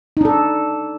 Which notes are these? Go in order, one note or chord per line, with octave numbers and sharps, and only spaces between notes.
D4 D#4 A4